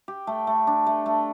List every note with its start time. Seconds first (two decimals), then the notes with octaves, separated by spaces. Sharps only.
0.08 G4
0.27 A3
0.47 A3
0.67 D4
0.86 A3
1.06 A3